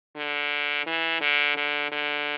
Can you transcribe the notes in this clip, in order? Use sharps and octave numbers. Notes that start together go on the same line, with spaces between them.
D3
E3
D3
D3
D3